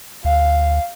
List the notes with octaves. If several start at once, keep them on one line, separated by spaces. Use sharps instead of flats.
D2 F5